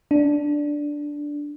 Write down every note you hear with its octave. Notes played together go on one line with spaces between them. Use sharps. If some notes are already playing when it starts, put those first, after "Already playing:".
D4